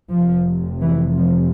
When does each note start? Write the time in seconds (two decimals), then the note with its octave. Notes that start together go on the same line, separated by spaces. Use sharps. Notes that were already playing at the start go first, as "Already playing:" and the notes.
0.10 F1 F2 C3 F3
0.81 E3
1.17 F3